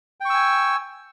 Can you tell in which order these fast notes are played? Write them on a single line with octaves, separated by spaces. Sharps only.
G5 C#6 E6 G#5